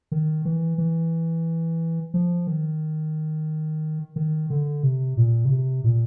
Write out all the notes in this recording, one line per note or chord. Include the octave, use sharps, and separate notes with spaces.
D#3
E3
E3
F3
D#3
D#3
D3
C3
A#2
C#3
C3
A#2